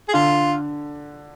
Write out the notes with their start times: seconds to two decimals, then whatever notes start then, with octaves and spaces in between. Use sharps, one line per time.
0.09 G#4
0.14 D3 F4